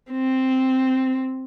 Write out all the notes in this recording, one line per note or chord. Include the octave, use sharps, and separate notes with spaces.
C4